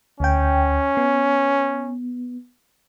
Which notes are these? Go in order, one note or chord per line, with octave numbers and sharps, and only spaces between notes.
D2 C#4 G5
B3